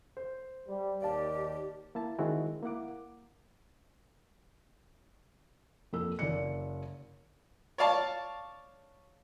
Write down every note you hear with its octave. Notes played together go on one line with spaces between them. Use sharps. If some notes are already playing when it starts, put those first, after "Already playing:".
C5
G3
D#2 G4 D5 F5 A5
A#3 E4 A5
D#3 G#3 C4 E4 F#4 G#4
A#3 E4 F#5 D6
F2 A#3 A4 E6
F#1 D5 C#7
C#5 D5 F5 A5